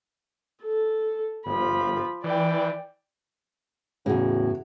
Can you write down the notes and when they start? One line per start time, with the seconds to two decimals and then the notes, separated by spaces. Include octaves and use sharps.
0.64 A4
1.46 G1 F3 B5
2.24 E3 D5 G5
4.06 E2 A2 C#3 E4 F#4